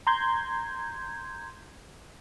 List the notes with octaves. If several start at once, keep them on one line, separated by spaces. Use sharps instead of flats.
A#5 C6 G6 G#6